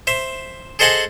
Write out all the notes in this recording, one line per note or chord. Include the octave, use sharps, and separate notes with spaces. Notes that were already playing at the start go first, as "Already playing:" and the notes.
C5 E5
G#4 A4 C5 D#5 F#5 G#5